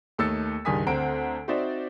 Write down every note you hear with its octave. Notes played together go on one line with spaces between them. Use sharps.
D#2 A3 D#4 E6 A6 C#7
C#2 G2 D#3 G#5 D#6 B6
D2 C4 A#5 D7
C4 D#4 F#4 C5 D5 E5